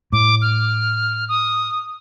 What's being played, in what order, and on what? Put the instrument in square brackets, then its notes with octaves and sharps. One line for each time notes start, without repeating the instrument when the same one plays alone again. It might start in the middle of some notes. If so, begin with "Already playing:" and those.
[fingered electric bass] A2 [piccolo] D6
[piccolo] F6
D#6